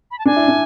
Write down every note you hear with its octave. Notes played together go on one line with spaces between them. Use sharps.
B5
A5
D4 G#5
E4
D4